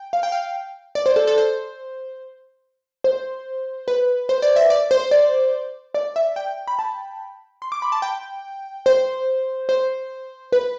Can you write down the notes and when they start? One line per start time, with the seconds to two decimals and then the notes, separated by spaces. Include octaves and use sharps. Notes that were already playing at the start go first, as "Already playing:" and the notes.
Already playing: G5
0.13 F5
0.23 G5
0.32 F5
0.95 D5
1.06 C5
1.16 A4
1.27 A4
1.38 C5
3.04 C5
3.88 B4
4.29 C5
4.42 D5
4.56 E5
4.70 D5
4.91 C5
5.11 D5
5.95 D5
6.16 E5
6.36 G5
6.67 B5
6.79 A5
7.62 C6
7.72 D6
7.82 B5
7.92 A5
8.02 G5
8.86 C5
9.69 C5
10.52 B4